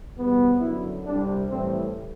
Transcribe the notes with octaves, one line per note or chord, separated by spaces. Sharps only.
E2 C3 G3 B3
F#2 D3 F#3 E4
C2 C3 G3 D4
A2 E3 G3 C4